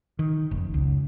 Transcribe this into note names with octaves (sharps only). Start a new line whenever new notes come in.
D#3
F1
C#2